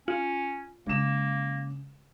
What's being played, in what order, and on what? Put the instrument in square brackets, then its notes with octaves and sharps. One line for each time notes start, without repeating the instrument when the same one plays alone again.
[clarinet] C#4 [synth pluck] F4
[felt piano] C#3 E7 [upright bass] G#3 [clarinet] A#3